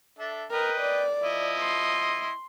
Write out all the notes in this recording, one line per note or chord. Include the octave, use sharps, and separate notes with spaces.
D4 A4 E5
A#4 B4 D#5 G5
D5
F3 E4 D#5
C6